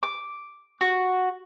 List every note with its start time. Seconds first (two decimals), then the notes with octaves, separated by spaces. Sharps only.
0.03 D6
0.81 F#4